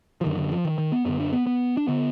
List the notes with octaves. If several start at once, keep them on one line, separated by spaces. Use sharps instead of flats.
F3
F#2 D3 D#3
D3
F3
D#3
D#3
B3
F#2 D3 B3
D4
B3
B3
D4
D3 B3